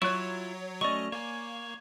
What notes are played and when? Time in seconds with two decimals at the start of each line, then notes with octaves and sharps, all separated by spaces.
0.02 F#3 E4 F4 C#5 C#6 F#6
0.81 F#3 A3 C#4 D5 D#5 C#6
1.12 A#3 C#5 G#5